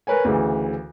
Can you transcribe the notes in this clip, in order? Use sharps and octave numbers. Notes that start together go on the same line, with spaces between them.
A#4 B4 C#5 G#5
D2 C#3 E3